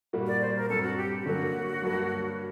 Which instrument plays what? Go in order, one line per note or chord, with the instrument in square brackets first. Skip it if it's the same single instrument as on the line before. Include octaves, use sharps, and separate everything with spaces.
[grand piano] A#2 G3 A#3 F#4
[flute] D5
C5
A#4
[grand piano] G2 F#3 C4 [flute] A4
[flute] F#4
G4
G4
[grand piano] D3 F#3 A#3 [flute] F#4
[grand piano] G2 F#3 A#3